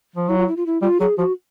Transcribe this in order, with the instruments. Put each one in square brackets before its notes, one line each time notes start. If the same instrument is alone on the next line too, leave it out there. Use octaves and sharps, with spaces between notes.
[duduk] F3
[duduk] F#3 [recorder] E4
[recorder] F4
E4
F4
E4
[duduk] G3 [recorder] F4
[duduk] F#3 [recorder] G#4
[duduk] F3 [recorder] F#4